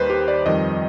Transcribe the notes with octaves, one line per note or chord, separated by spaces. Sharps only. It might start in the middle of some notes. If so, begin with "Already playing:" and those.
Already playing: D#2 D#3 G3 B4 C5
G4
D5
F2 D#3 G3 D#5